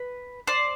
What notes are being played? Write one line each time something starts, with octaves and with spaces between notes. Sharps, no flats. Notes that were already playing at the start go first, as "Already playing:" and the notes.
Already playing: B4
C5 D5